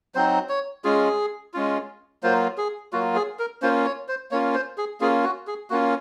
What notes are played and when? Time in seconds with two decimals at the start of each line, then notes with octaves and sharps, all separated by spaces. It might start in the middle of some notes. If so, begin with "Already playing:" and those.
0.15 F#3 C4 D#4 C5
0.49 C#5
0.84 G#3 C#4 F4 G#4
1.54 G#3 C#4 F4
2.23 F#3 A#3 F4 C5
2.58 G#4
2.93 F#3 A#3 F4 F#4
3.16 G#4
3.39 A#4
3.62 A#3 C#4 F4 C5
3.85 C#5
4.08 C5
4.31 A#3 C#4 F4 C#5
4.54 C5
4.78 G#4
5.01 A#3 C#4 F4 G#4
5.24 F#4
5.47 G#4
5.70 A#3 C#4 F4 F#4